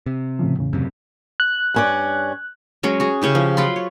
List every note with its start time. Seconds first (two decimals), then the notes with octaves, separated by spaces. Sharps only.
0.06 C3
0.39 A2 C#3 F3
0.59 E2 A2 C#3
0.73 F#2 C3
1.40 F#6
1.74 G2 C#4 D5
2.83 F#3 G#3 C#4
3.00 F#4 G#4
3.22 C#3 C#4 E4 G4
3.35 F3
3.57 F#3 F4 B5 C6
3.76 C#5